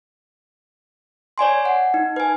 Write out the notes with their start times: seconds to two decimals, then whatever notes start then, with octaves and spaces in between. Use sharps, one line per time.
1.38 C#5 D5 G#5 C6
1.65 F#5
1.94 D#4
2.16 B4 G#5